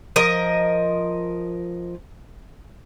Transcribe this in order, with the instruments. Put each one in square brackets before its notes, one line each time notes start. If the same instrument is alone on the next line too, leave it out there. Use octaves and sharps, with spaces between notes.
[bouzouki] F3 A#4 D#5